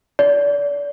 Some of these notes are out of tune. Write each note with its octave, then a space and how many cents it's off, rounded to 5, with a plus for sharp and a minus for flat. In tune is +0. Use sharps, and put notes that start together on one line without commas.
D5 -35